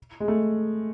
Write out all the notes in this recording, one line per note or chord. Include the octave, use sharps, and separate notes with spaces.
G#3
A3